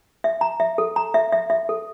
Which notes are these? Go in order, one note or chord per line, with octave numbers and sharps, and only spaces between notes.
E5
A#5
E5
A4
A#5
E5
E5
E5
A4